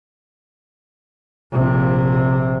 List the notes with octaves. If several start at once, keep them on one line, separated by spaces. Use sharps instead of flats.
A#1 C3